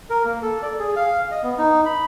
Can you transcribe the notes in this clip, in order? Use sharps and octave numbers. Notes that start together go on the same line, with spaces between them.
A#4
A#3
A4
D5
G#4
F5
D#5
B3
D#4
B5